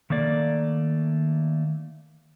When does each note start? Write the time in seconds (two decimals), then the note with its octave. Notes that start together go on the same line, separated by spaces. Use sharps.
0.10 D#3 A3 A#3 D5